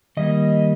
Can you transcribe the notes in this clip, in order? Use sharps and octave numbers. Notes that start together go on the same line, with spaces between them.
D#3 G3 A#3 D#5